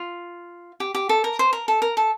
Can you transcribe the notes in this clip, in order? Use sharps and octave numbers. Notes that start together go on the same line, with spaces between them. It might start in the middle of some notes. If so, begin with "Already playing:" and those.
Already playing: F4
G4
G4
A4
A#4
C5
A#4
A4
A#4
A4